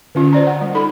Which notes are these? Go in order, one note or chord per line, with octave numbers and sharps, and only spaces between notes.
D3 C#4 F4
C5 D5 A#5
F#5
G3
D#4 A4 B5